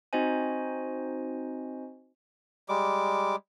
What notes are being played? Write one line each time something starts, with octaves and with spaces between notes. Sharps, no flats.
C4 D#4 F#4 C5 D#5 G#5
G3 G#3 D6